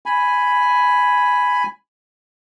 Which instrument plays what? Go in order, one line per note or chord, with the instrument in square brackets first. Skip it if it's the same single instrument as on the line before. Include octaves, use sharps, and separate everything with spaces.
[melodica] G#5 B5